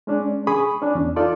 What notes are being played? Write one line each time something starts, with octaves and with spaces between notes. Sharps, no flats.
G#3 C#4 D4
G#4 B5 C#6 D#6
C#4 D4
E2
D#4 F4 A4 D5